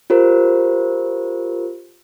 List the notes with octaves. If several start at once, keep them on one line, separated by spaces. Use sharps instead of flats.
F4 G4 A#4 C5